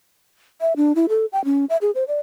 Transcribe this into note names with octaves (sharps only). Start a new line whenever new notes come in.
E5
D4
E4
A4
G5
C#4
E5
G#4
C5
D5